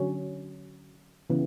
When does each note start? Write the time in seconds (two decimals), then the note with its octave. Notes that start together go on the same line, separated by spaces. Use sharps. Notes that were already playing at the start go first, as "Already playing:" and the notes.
Already playing: D3 F#3 C#4
1.30 C#3 E3 B3